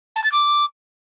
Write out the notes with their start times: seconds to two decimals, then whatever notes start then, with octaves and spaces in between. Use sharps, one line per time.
0.16 A5
0.24 A6
0.32 D6